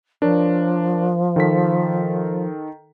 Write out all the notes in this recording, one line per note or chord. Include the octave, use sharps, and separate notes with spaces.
F3 D4 A#4 C#5
D#3 A4 B6